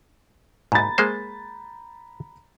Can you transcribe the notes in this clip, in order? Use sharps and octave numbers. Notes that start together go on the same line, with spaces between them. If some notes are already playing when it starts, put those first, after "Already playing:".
G#2 A#5 B5 A6
G#3 A#3 C5